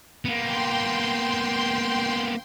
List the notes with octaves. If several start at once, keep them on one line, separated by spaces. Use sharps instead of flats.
A#3 B3 G5 C6